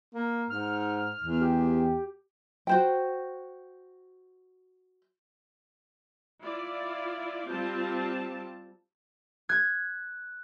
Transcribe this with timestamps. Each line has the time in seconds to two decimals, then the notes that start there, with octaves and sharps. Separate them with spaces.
0.14 A#3
0.50 G#2 F6
1.24 E2
1.41 G4
2.67 F#4 C5 G5
6.41 E4 F4 D5
7.47 G3 C4 F4 A5
9.49 F#6 G#6